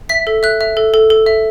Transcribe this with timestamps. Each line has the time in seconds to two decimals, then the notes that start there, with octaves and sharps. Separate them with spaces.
0.09 E5 B6
0.27 A4
0.43 E5 F#6
0.61 E5
0.77 A4
0.94 A4
1.10 A4
1.26 E5